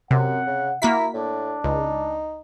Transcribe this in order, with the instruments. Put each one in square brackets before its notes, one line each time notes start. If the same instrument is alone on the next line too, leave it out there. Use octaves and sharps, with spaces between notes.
[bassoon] F#2 [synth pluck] C3 [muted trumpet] F#5
[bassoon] C#3
[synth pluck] A#3 F#4 B6 [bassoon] E4 [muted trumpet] A#5
[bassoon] A2 [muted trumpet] D4
[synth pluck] C#2 [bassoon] D#4